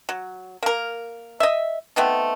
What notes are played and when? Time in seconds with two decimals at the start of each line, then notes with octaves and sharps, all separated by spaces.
0.09 F#3
0.63 A#3 A#4
1.40 D#5 E5
1.96 A3 B3 C4 D#4